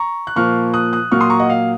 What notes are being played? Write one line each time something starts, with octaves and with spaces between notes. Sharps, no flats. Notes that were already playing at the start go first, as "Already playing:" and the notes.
Already playing: A#5 C#6
F#6
A#2 F3 A#3 C#6 F6
D#6 F#6
D#6 F#6
A#2 F#3 A#3 C#6 F6
C6 D#6
A#5 C#6
D#5 F#5
F5